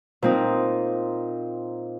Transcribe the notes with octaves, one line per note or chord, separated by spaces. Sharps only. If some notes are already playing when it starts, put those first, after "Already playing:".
A#2 C4 D#4